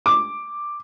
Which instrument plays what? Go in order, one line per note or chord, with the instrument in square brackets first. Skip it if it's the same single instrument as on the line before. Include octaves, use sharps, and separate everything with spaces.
[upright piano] D6